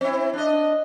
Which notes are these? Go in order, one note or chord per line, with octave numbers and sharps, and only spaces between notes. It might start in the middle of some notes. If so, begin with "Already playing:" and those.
C4 E4
D4 D#5